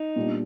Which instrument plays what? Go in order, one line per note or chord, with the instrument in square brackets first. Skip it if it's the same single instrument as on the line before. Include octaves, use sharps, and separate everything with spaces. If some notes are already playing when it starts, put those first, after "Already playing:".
Already playing: [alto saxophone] D#4
[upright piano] A#2 G3 B3 D4